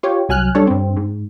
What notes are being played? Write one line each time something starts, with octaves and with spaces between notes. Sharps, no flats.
F4 G4 C#5
C2 F#3 G#5 F6 F#6
G3 D4 A4 C#5
G2 C4
G#2